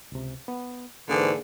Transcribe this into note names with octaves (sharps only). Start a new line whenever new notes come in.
C#2 C3
B3
G#2 D3 E3 A#3 D4 G#4